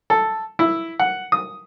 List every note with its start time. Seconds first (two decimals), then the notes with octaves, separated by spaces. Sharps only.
0.10 A4
0.59 E4
0.99 F#5
1.32 D#6